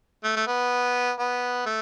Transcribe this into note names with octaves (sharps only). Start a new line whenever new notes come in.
A3
A3
B3
B3
A3